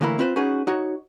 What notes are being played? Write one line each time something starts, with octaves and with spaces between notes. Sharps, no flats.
D2 A2 E3 A#3 E4 B5
C4 F4 B4 C5
C#4 D#4 F#4 G#4 B4
D#4 F#4 C#5